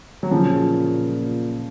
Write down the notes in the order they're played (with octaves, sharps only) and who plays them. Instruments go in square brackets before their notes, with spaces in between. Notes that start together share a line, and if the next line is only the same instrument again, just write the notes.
[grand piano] F#3
[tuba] A#2 [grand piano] C#3 F3